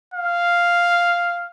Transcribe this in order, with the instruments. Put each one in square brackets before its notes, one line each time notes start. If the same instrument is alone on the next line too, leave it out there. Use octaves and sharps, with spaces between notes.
[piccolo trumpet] F5